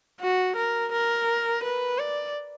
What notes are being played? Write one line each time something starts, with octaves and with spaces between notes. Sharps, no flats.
F#4
A#4
A#4
B4
D5